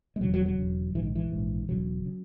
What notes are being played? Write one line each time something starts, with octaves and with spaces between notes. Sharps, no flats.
G#3
E1 E2 C#3 F#3
F#3
F#3
E1 E2 C#3
A#1 G#2 E3
D#3
E3
A#1 G#2
E1 E2 C#3 F#3
C#3